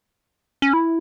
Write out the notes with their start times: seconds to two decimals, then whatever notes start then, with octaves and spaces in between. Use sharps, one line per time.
0.62 C#4
0.73 E4